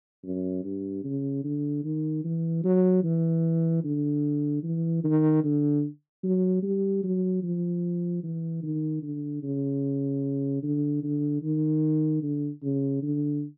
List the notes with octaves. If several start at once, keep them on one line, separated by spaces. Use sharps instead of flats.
F#2
G2
C#3
D3
D#3
E3
F#3
E3
D3
E3
D#3
D3
F#3
G3
F#3
F3
E3
D#3
D3
C#3
D3
D3
D#3
D3
C#3
D3